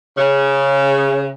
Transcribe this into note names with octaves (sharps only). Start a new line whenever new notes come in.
C#3